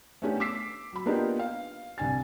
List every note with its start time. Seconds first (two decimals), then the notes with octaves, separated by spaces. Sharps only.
0.22 A3 B3 C#4 D4 G4 B4
0.40 D6 E6 B6 C7
0.93 F#3 B5
1.06 A#3 B3 D4 D#4 F4 G4
1.39 F5
1.98 C2 D4 G#5 A6